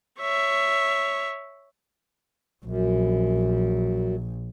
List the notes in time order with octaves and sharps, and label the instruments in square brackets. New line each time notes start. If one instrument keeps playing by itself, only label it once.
[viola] C#5 E5
[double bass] A#1 [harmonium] F#2